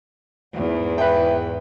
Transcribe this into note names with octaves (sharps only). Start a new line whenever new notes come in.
E2 G#2
B4 E5 G5